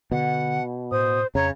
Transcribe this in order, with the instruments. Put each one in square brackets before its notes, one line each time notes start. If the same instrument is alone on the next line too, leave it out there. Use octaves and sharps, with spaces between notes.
[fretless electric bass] B2 [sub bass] D3 [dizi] F#5
[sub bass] A2 [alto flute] C5 [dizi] D#6
[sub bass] F2 [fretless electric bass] C#3 [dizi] C#5 [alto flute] A#5